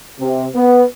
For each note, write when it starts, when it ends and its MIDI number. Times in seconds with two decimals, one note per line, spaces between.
0.20 0.47 48
0.55 0.83 59